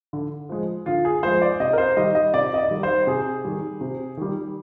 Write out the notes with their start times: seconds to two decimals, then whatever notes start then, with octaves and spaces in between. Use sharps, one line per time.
0.13 D3
0.49 F3 G#3
0.86 D3 F4
1.05 G#4
1.23 F3 G#3 C5
1.42 D5
1.60 C3 D#5
1.73 A#4
1.78 C5
1.97 D#3 G3 D#5
2.15 D#5
2.34 C3 D5
2.54 D#5
2.58 D5
2.71 D#3 G3
2.83 C5
3.07 C3 G#4
3.45 D#3 G3
3.81 C3
4.17 D#3 G3